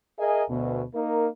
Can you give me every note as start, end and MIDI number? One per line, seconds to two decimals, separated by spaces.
0.18 0.43 68
0.18 0.43 70
0.18 0.43 75
0.18 0.43 76
0.18 0.43 80
0.49 0.82 38
0.49 0.82 47
0.94 1.27 58
0.94 1.27 63
0.94 1.27 70